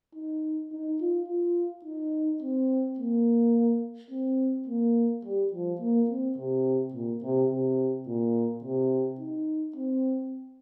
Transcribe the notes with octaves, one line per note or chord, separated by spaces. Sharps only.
D#4
D#4
F4
F4
D#4
C4
A#3
C4
A#3
G3
F3
A#3
C4
C3
A#2
C3
C3
A#2
C3
D#4
C4